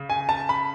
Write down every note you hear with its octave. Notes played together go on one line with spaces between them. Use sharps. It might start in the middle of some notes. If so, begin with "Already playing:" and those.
Already playing: C#3
G#5
A5
B5